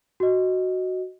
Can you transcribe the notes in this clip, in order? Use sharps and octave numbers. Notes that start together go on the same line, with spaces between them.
F#4 D#5